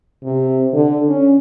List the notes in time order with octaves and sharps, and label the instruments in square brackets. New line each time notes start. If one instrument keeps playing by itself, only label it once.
[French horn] C3
D3
C#4